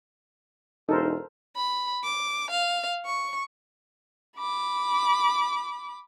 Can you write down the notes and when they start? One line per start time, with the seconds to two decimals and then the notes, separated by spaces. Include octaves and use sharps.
0.89 E1 D#4 A4 A#4 C5
1.56 B5
2.04 D6
2.50 F5
3.04 C#6
4.38 B5 D6